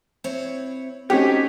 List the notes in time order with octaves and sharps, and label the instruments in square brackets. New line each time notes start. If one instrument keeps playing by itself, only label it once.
[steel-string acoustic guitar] C4 E4 C#5
[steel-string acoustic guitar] A3 C4 F#4 [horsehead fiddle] C#4 D#4 [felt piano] G4